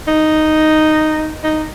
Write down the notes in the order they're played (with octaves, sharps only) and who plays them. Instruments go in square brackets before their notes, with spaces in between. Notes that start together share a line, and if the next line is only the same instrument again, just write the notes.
[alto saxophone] D#4
D#4